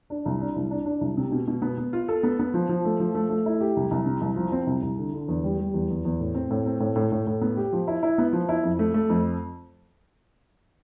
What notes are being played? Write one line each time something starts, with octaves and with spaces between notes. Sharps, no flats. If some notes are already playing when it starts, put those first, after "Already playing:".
D4
C2
D4
C2
D4
D4
C2
C3
B2
B2
B3
B3
F4
A4
B3
B3
F3
F3
A3
F3
A3
A3
E4
G4
C2
C2
C3
C2
F3
C4
C2
C2
D3
D3
E2
G3
G3
E2
E2
E2
A2
C4
A2
C4
A2
A2
A2
A2
B3
G4
F3
E4
E4
B3
F3
E4
F2
A3
A3
F2